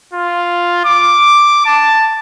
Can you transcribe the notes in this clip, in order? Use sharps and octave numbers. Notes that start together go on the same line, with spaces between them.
F4
D6
A5